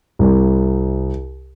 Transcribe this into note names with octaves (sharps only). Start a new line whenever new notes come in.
C2